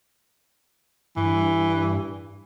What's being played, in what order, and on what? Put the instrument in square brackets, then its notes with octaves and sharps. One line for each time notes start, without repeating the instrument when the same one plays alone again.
[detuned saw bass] G2 [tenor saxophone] E3